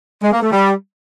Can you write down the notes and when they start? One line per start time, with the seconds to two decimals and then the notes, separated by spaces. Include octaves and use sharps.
0.23 G#3
0.33 A#3
0.42 A3
0.52 G3